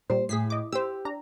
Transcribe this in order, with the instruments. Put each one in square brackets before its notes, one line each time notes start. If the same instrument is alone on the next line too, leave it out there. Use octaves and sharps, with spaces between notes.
[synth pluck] A#2 G3 [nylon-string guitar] C5
[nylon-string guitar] A2 [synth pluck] G#4 B6 C7
[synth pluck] D#5 D6
[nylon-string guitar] G4 [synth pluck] C5 E6
[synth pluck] D4 A#5